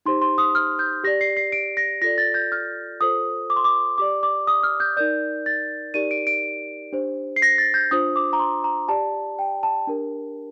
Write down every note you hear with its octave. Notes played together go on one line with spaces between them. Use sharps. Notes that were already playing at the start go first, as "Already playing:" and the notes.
D#4 G4 C5 C6
C6
D#6
F6
G6
G4 D5 A#6
C7
C7
D7
A#6
F4 A4 D5 A#6
A6
G6
F6
F4 A4 C5 D#6
D6
C6
D6
G4 D5 D6
D6
D#6
F6
G6
D#4 A#4 D5 G6
A6
D#4 G4 A#4 D5 D#7
D7
D7
D4 G4 C5
C7
A#6
A6
G6
D4 F4 C5 D#6
D6
A#5
C6
A#5
G4 D5 A5
G5
A5
D4 G4 A#4